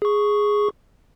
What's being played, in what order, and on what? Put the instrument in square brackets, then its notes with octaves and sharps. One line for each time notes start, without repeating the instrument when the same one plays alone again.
[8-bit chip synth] G#4 C#6